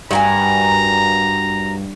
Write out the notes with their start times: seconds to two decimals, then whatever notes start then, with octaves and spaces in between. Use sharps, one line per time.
0.11 G2 F#4 A#4 G#5 A#5